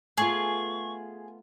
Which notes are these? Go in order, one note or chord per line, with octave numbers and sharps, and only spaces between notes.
A3 B3 F4 G#4 C#6